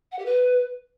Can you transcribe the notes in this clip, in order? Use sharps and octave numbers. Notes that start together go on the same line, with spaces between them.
F#5
G4
B4